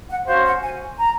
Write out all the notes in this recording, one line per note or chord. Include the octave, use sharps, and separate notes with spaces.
F#5
C#4 F#4 C5 F5
F#5
G#5
A#5